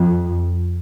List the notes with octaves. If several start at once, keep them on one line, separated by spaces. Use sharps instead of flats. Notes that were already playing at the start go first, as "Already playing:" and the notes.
Already playing: F2